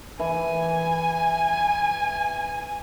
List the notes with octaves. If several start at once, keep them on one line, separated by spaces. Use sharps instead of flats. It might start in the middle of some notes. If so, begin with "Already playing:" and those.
E3 G#5